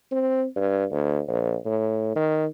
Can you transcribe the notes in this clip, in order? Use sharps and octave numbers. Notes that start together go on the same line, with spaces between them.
C4
G2
D2
A#1
A2
D#3